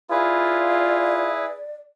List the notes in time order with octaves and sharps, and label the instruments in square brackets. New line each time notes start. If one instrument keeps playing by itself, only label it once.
[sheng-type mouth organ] E4 G#4 B4 [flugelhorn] F4 [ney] D5